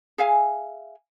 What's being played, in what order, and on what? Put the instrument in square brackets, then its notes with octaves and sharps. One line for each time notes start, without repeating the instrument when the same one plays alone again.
[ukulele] G#4 E5 F5 G#5